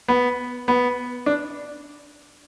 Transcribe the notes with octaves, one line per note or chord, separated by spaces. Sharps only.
B3
B3
D4